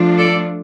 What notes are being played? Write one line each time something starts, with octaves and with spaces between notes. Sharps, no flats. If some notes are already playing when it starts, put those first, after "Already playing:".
Already playing: F3 A3 D4 F4
A4 D5